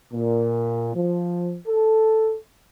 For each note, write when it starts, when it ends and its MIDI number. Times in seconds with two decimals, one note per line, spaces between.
0.12 0.92 46
0.94 1.57 53
1.67 2.35 69